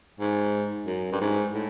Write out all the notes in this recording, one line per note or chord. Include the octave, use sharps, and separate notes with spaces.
G#2
F#2
G2
G#2
A2